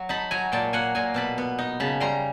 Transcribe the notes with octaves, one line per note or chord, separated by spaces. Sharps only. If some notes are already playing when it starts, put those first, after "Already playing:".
Already playing: F#3
D#4 A5 B5
F#3 G#5 A#5
A#2 G5 A5
A#3 F#5 G#5
A#2 G#5 A#5
B2 A5 B5
B3
D#4
C#3 A5 B5
G3 A#5 C6